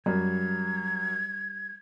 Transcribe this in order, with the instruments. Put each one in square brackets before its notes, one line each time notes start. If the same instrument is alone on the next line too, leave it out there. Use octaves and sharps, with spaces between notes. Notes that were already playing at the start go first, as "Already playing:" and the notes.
[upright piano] F#2 [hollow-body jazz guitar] G3 [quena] G#6